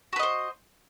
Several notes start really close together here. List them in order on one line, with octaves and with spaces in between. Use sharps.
F#4 B4 D#5 C5